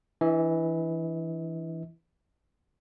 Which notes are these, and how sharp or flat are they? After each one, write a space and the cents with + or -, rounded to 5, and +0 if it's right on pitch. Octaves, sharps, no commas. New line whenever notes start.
E3 +0 D4 +0 E5 -45